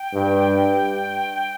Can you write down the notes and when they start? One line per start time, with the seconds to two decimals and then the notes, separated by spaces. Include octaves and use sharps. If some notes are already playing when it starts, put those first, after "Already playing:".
Already playing: G5
0.13 G2